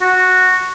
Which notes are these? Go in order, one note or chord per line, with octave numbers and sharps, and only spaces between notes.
F#4